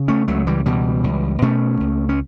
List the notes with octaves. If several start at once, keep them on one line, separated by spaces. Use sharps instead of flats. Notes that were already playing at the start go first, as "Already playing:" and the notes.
Already playing: C#3
A3 C#4
C#2 F#3 A3
E3 G3
B2 E3 G3
C#2
B2 A3 C#4
C#2
C#4